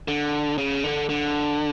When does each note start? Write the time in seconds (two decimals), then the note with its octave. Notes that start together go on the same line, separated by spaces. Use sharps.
0.08 D3
0.58 C#3
0.84 D3
1.10 D3